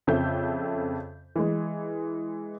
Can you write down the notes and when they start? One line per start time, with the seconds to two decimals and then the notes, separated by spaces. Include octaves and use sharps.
0.07 F2 C#3 C4 A4 E5 G6
1.36 E3 G#3